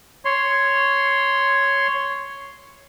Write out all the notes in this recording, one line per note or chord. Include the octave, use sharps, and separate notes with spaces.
C#5 C6